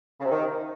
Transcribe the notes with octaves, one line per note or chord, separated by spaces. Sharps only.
C#3
C3
D#3